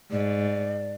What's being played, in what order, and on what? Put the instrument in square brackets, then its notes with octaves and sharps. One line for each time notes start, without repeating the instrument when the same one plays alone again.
[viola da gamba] G#2 [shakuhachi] D5